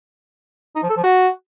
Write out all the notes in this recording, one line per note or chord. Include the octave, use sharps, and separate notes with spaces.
D#4
F3
A4
F3
F#4